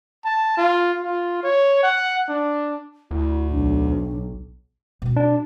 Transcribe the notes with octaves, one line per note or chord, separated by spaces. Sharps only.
A5
F4
F4
C#5
F#5
D4
D2 E4
B1 D4
B2 C4
D4